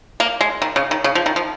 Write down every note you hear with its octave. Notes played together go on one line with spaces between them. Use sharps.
A#3
G#3
D#3
C#3
D#3
C#3
F3
D#3
F3